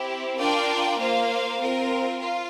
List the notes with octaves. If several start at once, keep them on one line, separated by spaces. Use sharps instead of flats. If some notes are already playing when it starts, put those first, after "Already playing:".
Already playing: C4 E4 G4
D4 F4 A#4 D5 G5
A#3 F4 C5 F5
C4 F4 A#4
F4